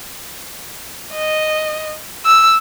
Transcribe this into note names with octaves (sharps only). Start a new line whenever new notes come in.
D#5
E6